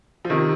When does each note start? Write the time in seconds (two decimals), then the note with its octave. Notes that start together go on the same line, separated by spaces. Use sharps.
0.25 F3
0.30 C3 D#3